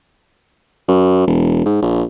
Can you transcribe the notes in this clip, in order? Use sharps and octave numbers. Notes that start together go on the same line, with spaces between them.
F#2
E1
G#2
A#1